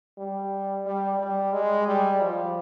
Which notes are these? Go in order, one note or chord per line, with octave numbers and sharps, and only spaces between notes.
G3
G3
G3
G#3
G3
F3